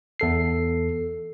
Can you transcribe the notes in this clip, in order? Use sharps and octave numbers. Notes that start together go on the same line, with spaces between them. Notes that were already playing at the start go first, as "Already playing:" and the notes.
E2 A4 C7